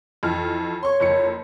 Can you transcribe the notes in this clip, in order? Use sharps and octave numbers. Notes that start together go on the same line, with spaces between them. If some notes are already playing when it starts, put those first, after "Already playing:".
F2 E3 F6
C#5 C6 C#6
F#1 F2 C#7